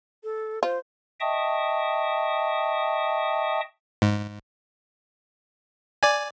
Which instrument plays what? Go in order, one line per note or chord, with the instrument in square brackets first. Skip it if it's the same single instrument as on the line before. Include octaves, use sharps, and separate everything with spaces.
[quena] A4
[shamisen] F4 [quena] C5
[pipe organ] D#5 E5 G5 A5 C#6 D#6
[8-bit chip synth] G#2
D5 G#5